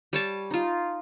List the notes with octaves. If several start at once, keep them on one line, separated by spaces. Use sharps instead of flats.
G3 C#5 A5
D#4 F4